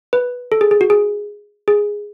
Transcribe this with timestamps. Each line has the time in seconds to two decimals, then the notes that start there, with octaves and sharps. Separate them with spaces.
0.13 B4
0.52 A4
0.61 G#4
0.71 G#4
0.81 F#4
0.90 G#4
1.68 G#4